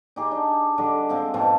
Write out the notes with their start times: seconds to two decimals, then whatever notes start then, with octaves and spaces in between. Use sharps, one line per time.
0.16 D#4 G4 G#4
0.31 D4
0.78 D3 G3 D#5 D6
1.09 G#3 C4 F4
1.34 G#2 B2 C4 A5